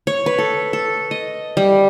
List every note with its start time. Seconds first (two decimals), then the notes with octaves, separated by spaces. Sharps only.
0.07 C#5
0.26 B4
0.39 A4
0.73 A4
1.11 D#5
1.57 G3